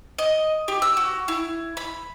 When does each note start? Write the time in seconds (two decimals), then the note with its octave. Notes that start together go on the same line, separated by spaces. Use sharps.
0.18 D#5
0.68 G4
0.82 E6
0.97 F#4
1.28 E4
1.77 B5